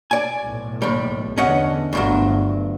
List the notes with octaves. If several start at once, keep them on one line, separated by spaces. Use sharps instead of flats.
D5 G#5
B1 A2
D#2 G3
E2 D3 C#4 D#5 F#5
G1 D2 G2 F#3